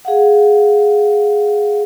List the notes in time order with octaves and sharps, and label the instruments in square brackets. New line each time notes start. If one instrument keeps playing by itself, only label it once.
[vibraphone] G#4 F5 F#5